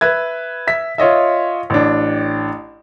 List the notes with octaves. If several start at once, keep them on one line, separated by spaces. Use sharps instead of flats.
B4 E5 G#6
E5 B6
F4 C#5 D#5 E5
A1 D4